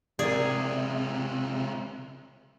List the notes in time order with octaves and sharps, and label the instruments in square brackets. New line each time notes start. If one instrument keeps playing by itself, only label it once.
[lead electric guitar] C#2 C3 [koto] G#4 [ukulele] A#4 D5